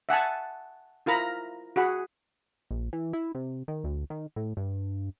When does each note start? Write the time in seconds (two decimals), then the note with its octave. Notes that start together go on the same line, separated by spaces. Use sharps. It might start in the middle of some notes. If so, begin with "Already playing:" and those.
0.09 E5 F#5 G#5 A5
1.06 E4 F4 A#4 A#5 B5
1.76 F#4 G#4 F#5 B5
2.71 A#1
2.93 E3
3.13 E4
3.35 C3
3.68 D#3
3.84 D2
4.10 D#3
4.36 A2
4.57 G2